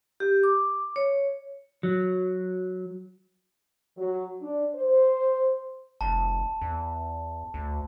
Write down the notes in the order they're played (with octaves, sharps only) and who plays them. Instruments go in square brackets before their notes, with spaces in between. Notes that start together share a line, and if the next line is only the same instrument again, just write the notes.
[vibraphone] G4
D6
C#5
[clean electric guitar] F#3
[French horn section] F#3
D4
C5
[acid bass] F1 [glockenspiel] A5
[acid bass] E2
D2